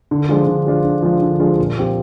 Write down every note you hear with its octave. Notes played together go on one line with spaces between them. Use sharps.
D3
F3 G#3 D4 F4
D3
F3 G#3 D4 F4
D3
F3 G#3 D4 F4
D3
F3 G#3 D4 F4
A#2
F3 C4 G4